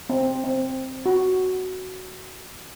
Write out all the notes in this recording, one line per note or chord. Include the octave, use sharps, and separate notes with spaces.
C4
C4
F#4